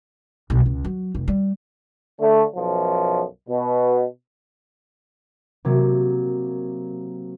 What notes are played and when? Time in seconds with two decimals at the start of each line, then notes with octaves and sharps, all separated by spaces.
0.50 B1
0.66 C#2
0.84 F#3
1.15 F1
1.28 G3
2.19 D3 A3
2.56 B1 F#2 F3
3.49 B2
5.65 C3 F#3 A#3